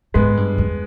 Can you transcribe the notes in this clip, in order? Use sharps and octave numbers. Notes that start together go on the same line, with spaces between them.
G#2 G#3 B3
G2
E2